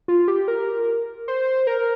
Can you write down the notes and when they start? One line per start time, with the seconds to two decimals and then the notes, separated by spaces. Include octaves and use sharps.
0.08 F4
0.28 G4
0.48 A#4
1.28 C5
1.67 A#4